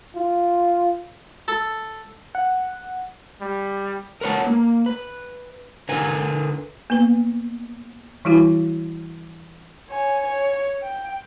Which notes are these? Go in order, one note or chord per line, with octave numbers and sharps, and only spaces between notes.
F4
A4
F#5
G3
A#4 B4 C#5 F#5 A5
A#3
B4
D3 A#4 B4 G#5
A#3 B3 B4
E3 G3 E4 F#4
C#5 G#5
C#5
G5